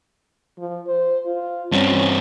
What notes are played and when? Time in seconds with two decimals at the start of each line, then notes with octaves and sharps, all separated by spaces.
0.58 F3
0.87 C5
1.26 F4
1.72 G2 C4 C#4